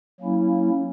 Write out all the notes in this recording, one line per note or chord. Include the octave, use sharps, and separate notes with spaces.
F#3 A#3 C#4 E4